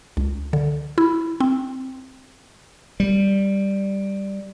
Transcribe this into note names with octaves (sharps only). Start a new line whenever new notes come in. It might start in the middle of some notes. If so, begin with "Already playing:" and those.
C#2
D3
E4
C4
G3